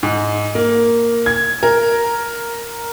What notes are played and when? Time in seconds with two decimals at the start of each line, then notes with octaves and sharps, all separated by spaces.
0.03 G#2
0.55 A#3
1.26 G#6
1.63 A#4